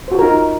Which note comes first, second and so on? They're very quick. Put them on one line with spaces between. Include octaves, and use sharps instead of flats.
C5 F#4 F4 A#4 D#4